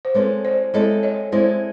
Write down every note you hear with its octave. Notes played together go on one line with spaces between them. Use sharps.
C5
G#3 C4 E4 A4 B4 C#5
C5 D5
G#3 C4 E4 A4 C#5 D#5
C#5 D#5
G#3 C4 E4 A4 C5 D5